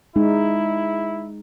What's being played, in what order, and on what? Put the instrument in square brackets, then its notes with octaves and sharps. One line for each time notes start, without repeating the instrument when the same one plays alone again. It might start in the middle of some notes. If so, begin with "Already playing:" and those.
[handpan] G#3 D#4 [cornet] E4